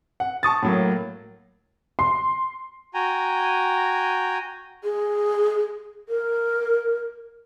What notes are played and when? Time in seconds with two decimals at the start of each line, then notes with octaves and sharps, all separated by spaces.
0.20 F#5
0.43 A5 C#6 D#6 A6
0.63 A2 F#3 A#3
1.99 C6
2.94 F#4 G5 G#5 A#5
4.84 G#4
6.09 A#4